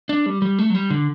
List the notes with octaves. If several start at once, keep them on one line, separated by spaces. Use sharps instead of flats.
D4
G3
G3
A3
F#3
G3
D3